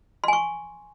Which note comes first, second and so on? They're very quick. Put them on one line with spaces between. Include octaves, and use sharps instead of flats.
C6 G#5 C#6